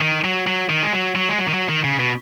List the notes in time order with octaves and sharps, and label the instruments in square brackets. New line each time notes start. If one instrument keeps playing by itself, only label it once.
[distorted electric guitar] D#3
F#3
F#3
D#3
G#3
F#3
F#3
G#3
F#3
D#3
F#3
D#3
C#3
B2